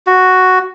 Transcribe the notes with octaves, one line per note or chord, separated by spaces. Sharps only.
F#4